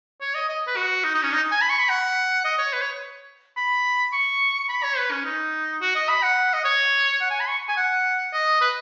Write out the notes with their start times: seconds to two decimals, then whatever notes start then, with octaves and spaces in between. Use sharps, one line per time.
0.21 C#5
0.35 D#5
0.49 D#5
0.67 B4
0.76 F#4
1.04 D#4
1.14 D#4
1.23 C#4
1.33 D#4
1.51 G#5
1.61 B5
1.69 C#6
1.79 B5
1.89 F#5
2.44 D#5
2.58 C#5
2.73 B4
2.82 C#5
3.57 B5
4.13 C#6
4.69 B5
4.83 C#5
4.97 B4
5.11 C#4
5.25 D#4
5.81 F#4
5.95 D#5
6.09 B5
6.23 F#5
6.53 D#5
6.64 C#5
7.21 F#5
7.30 G#5
7.40 B5
7.48 C#6
7.68 G#5
7.77 F#5
8.33 D#5
8.61 B4